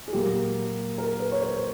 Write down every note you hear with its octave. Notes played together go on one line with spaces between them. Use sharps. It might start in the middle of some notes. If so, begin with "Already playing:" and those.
G#4
A#2 F#3 A#3 G4
A#4
B4
C#5
C5